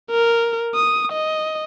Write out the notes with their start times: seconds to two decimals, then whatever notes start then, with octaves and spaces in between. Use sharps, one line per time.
0.11 A#4
0.75 D#6
1.12 D#5